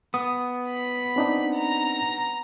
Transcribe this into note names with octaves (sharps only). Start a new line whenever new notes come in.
B3 D#6
B5
C4 D4 D#4
A#5